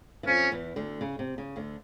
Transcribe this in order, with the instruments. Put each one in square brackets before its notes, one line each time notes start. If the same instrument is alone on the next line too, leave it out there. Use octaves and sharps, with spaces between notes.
[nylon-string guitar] E3
[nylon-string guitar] F2 F3 [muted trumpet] C#4
[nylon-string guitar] E2 E3
D2 D3
C#3
C3
C#3
D2 D3